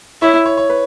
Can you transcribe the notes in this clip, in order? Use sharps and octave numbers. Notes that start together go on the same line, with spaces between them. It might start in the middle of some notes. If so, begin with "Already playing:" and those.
E4 C#5
C#5
C#5
B4